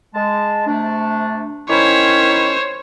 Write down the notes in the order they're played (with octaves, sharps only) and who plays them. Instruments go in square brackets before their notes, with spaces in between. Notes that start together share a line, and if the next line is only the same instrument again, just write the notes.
[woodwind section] G#3 A5
C3 A3 D4
[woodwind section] D#3 C#4 E4 [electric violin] C5 C#5